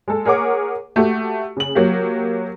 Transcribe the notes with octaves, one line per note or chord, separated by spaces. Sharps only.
G#3 A4
G#4 A#4 C#5 F#5 D6
A3 F#4 G4
C#3 F#7
F#3 A#3 G4